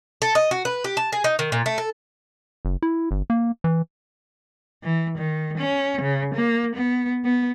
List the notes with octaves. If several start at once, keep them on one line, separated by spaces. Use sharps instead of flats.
A4
D#5
F#4
B4
G4
A5
G#4
D#4
D#3
A#2
A3
A4
F#1
E4
G1
A#3
E3
E3
D#3
C#4
C#3
A#3
B3
B3